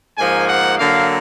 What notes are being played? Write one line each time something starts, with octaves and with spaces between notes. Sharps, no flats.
G#2 F3 A#3 G#5
F#5
D3 F#3 A#3 F5